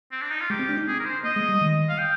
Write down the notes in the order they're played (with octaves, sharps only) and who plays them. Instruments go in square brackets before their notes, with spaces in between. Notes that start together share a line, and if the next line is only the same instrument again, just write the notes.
[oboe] C4
D4
D#4
F4
[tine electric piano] G#3 [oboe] G4
[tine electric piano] C4
D4
D#4
[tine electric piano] C4 [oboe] G#4
[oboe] A#4
C5
[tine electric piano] A#3 [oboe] D#5
[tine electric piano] G#3
G3
D#3
[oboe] F5
G5